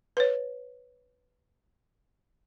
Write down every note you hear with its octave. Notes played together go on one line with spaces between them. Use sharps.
B4 C#5